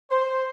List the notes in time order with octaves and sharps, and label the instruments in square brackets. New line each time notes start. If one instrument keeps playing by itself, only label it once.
[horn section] C5